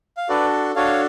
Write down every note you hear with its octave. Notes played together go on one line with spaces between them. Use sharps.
F5
D4 F#4 A4 B4 D5
D4 F#4 A4 C#5 F5